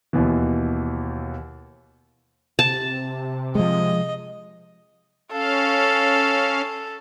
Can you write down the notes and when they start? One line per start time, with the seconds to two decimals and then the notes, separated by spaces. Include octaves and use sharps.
0.13 D#2 B2 E3
2.59 C3 A5
3.55 F3 G#3 D#5
5.32 C#4 A4 F5